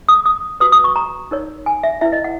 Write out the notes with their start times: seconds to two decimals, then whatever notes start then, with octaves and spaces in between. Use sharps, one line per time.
0.09 D#6
0.26 D#6
0.60 F#4 B4 D#6
0.72 D#6
0.84 C#6
0.96 A#5
1.31 D#4 A#4 C#5
1.66 G#5
1.83 E5
2.01 E4 B4 E5
2.12 D#5
2.24 F#5